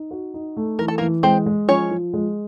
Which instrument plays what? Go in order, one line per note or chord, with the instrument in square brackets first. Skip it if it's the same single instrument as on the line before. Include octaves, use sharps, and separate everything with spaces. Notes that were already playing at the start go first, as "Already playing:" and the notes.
Already playing: [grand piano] D#4
F#4
D#4
A3
[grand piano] E3 [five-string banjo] A#4
[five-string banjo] A4
A#3 A#4
[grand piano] E3
[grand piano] G#3 [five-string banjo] C4 C5
[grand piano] G#3
[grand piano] F3 [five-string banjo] C#4 C#5
[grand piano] F3
G#3